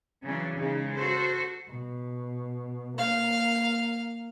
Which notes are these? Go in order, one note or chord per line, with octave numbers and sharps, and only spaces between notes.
C#3 E3 F#3 C#4 D4
C#3 G#3 D#4
F#4 A4 C5
B2
A#3 F5